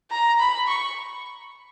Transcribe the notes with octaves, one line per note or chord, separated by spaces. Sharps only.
A#5
B5
C#6